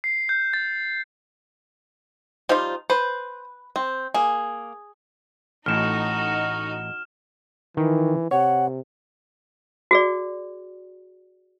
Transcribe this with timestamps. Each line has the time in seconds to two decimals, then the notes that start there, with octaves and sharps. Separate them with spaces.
0.04 C7
0.29 G6
0.54 A6
2.49 F3 G3 D#4 F4 C5
2.90 B4 C5
3.76 C4
4.14 A#3 G#4
5.66 A1 A2 D#4 F#4 F6 E7
7.77 D#3 E3
8.31 C3 C#5 F#5
9.91 F#4 G#4 D5